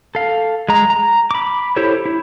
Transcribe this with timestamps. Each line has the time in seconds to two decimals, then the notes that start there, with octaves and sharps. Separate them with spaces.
0.15 A4 F5
0.69 G#3 A#5
0.90 A#5
1.31 B5 D6
1.76 E4 G4 A4 C5 C#5
2.06 E4